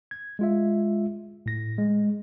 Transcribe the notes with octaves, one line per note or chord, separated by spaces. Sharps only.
G#6
G#3 F4 E5
A2 A#6
G#3